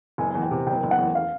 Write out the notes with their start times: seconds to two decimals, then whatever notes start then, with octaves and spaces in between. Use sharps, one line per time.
0.18 F#1 G#5
0.31 E2 G#5
0.43 G5
0.51 C3
0.67 F#1 G5
0.83 F#1
0.91 F#5
0.98 E2
1.15 F5